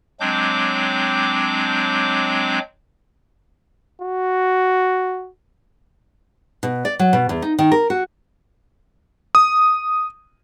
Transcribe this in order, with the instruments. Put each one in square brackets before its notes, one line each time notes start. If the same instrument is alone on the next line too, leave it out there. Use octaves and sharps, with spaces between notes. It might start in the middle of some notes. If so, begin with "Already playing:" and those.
[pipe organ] F#3 G#3 C4 D4 D6 G6
[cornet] F#4
[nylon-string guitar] B2
D5
F#3
B2
E2
D#4
D#3
A#4
F#4
[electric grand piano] D#6